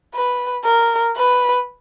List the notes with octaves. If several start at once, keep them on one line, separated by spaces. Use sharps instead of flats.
B4
A#4
B4